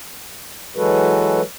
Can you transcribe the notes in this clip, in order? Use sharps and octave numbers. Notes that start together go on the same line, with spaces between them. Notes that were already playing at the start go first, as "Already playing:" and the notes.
E3 F#3 G#3 F#4 A4 B4